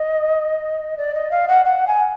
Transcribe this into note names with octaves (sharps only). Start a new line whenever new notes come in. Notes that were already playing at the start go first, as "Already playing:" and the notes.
Already playing: D#5
D5
D#5
F5
F#5
F#5
G#5